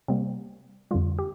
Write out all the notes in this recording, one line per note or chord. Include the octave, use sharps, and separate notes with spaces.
C3 G3 A#3 C4
F2 D3 G3 F4
G4